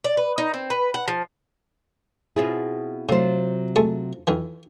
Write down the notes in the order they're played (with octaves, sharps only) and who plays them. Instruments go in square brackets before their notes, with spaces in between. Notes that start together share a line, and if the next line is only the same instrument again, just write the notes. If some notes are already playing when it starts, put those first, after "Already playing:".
[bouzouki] D5
B4
D#4
C4
B4
F#5
F3
[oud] B2 F4 G#4 [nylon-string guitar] C4 E4
[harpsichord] A2 [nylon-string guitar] C3 F#3 [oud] F4 C5
[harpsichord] G#3 A3 A4
F2 D#3 E3